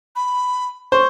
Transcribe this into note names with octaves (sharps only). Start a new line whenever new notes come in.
B5
C5 C#6